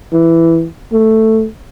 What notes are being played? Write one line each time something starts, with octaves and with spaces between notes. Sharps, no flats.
E3
A3